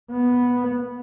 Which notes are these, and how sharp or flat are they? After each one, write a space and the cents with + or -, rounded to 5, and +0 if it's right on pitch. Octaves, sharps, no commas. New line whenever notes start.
B3 -5